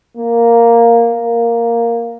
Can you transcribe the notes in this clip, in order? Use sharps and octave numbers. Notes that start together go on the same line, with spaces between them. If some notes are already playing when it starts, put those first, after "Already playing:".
A#3
A#3